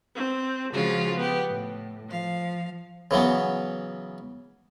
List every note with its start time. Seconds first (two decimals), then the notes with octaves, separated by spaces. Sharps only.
0.16 C4
0.73 C#3 F3 G#3 F4 F#4
1.16 B3 G4
1.50 A2
2.08 F3 F5
3.11 C#3 E3 F#3 B3